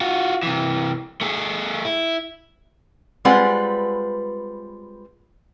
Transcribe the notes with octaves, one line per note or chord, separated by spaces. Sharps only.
F4 F#4
C3 E3
A3 G#4
E4
G3 G#3 C4 F4 B4 F#5